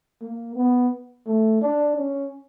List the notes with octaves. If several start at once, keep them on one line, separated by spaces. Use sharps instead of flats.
A#3
B3
A3
D4
C#4